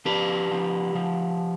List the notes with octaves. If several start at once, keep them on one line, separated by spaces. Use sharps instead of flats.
F3 G4 B4
F3
F3